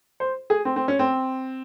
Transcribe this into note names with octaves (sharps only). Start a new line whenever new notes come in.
C5
G#4
C4
C4
C#4
C4